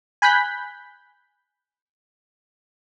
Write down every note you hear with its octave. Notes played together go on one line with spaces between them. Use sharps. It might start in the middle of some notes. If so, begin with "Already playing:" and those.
G#5 B5 F#6 G6 B6